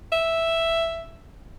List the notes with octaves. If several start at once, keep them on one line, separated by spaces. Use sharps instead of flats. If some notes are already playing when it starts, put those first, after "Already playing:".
E5